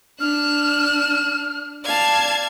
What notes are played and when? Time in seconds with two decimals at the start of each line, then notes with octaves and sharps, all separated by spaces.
0.20 D4 F6 F#6 E7
1.85 D5 F5 A5 G#6